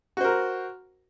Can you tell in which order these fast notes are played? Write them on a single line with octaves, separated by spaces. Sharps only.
F#4 C5 A#4